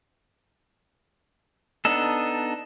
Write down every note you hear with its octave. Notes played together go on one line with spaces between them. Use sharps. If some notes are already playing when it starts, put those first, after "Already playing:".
B3 D4 D#4 A4